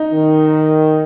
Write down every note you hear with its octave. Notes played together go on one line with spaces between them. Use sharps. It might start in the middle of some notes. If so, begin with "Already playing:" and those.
Already playing: D#4
D#3